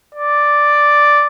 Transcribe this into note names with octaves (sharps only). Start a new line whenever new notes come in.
D5